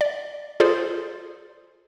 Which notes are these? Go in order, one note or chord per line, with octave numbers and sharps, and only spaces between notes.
D5
F4 G#4 A4 C5 D5